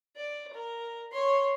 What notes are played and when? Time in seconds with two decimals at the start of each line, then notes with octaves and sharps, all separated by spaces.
0.16 D5
0.53 A#4
1.12 C#5 C6